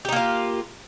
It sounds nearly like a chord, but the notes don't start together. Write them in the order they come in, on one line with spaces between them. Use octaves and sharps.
G4 D#4 A#3 F4